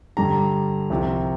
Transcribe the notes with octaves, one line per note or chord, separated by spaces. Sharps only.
G2 D3 G3 A#5
C2 C3 F3